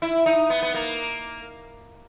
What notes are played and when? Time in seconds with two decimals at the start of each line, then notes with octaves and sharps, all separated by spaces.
0.02 E4
0.26 D#4
0.50 B3
0.62 B3
0.74 A#3